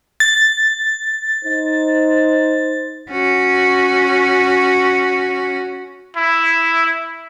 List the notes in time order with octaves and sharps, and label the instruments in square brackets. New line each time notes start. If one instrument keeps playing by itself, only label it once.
[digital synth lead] A6
[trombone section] D#4 C5
[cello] C#4 F#4
[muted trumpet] E4